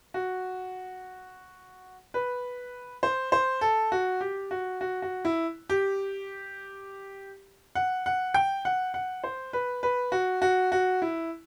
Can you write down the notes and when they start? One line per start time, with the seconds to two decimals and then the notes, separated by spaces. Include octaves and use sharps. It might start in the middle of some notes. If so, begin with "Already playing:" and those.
0.14 F#4
2.14 B4
3.03 C5
3.32 C5
3.61 A4
3.92 F#4
4.21 G4
4.51 F#4
4.81 F#4
5.02 F#4
5.25 E4
5.70 G4
7.75 F#5
8.06 F#5
8.34 G5
8.65 F#5
8.94 F#5
9.24 C5
9.53 B4
9.83 B4
10.12 F#4
10.42 F#4
10.72 F#4
11.02 E4